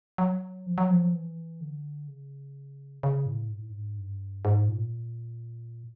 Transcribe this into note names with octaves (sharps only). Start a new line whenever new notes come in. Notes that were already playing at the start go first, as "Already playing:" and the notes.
F#3
F3
F#3
F3
E3
D3
C#3
C#3
A2
G#2
A2
G#2
G2
G#2
A#2